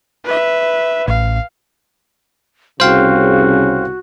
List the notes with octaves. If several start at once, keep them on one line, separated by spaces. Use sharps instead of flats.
B4 E5
A1 F5
C2 C#3 F#4 C5 F5 G5